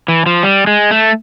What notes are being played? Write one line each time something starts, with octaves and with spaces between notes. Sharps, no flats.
E3
F3
G3
G#3
A3